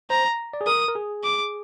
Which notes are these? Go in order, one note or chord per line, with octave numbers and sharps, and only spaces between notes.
C5 A#5
D5
G#4
A#4 D#6
A#4
G#4
D6